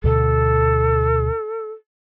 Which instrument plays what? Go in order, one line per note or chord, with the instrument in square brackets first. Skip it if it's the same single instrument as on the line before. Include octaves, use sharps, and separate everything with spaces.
[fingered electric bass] D2 B2 D3 [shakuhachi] A4